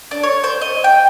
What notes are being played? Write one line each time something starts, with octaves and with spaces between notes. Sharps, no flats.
D4
C#5
C5
D#5
G5